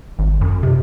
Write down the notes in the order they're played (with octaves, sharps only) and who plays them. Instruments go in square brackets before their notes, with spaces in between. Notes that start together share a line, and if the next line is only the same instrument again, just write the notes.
[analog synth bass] G#1
F#2
C3